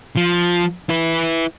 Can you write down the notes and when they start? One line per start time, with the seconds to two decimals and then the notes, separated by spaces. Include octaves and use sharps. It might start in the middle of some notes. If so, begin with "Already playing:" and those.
0.16 F3
0.90 E4 B4